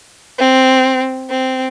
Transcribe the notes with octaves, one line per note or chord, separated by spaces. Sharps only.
C4
C4